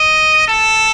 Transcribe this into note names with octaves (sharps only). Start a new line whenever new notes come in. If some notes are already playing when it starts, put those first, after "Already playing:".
Already playing: D#5
A4